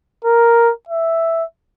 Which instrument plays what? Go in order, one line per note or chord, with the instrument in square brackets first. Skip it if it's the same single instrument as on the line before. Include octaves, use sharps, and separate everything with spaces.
[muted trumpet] A#4
E5